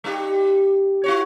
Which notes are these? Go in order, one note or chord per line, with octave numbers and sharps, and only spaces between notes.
G3 D#4 G4
E4 F#4 C#5